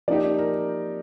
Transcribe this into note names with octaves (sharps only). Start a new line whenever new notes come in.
F3 A#3 D#4 G4 D5
A#4